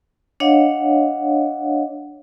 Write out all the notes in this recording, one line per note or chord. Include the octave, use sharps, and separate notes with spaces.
D4 C#5 D#5 F5 F#5